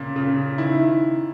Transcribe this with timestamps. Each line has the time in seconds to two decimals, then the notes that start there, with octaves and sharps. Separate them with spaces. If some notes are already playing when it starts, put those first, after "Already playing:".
Already playing: A#2 C#3
0.16 C#3
0.58 D#3 E4